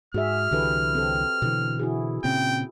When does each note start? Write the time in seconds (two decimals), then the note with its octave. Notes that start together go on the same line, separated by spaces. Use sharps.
0.14 G#2 F#4 G#4 E5 F6
0.51 C2 D3 E3 G4 A4 B4
0.95 C4 A4
1.42 B2 D3 E3
1.79 E4 F#4 G#4
2.24 A#2 C#3 C4 G5